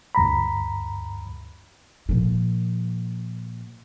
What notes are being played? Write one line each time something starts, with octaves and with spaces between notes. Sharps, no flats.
D2 G2 A#5 B5
A#2 F3